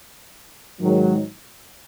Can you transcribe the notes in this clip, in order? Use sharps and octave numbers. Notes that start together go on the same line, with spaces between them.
G#2 D#3 F#3